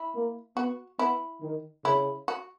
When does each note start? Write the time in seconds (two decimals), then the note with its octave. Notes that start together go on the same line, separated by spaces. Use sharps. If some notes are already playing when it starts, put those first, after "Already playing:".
Already playing: E4
0.14 A#3
0.57 B3 F#4
0.99 B3 E4
1.42 D#3
1.85 C#3 E4
2.28 F#4